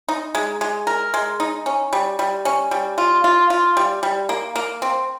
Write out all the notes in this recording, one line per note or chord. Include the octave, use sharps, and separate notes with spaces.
D#4
G#3
G#3
A#4
G#3
D#4
C#4
G3
G3
C#4
G3
F4
F4
F4
G3
G3
A#3
A#3
C4